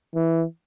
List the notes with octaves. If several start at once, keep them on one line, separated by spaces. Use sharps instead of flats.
E3